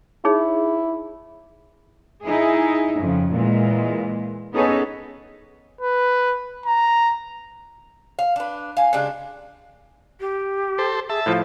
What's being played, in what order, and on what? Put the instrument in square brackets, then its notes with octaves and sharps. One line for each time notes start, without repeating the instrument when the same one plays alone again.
[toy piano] D#4 G#4 C#5 [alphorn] E4
[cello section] D#4 E4 G#4
F2 C#3
A#2 E3 G#3
B3 C#4 D#4 G#4 A4 C#5
[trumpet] B4
A#5
[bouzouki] F5
D4 B4
F5 G#5
C#3 G#3 D4 G4
[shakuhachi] G4
[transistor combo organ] A4 C5
[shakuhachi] G#4 [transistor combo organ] E5 A5
[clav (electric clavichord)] A2 F3 [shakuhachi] F5